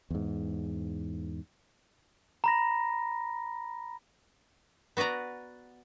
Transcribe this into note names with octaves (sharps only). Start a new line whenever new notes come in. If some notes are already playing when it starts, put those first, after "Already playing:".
E2 G#2
A#5 B5 A#6
B3 F#4 B4 D5 A#5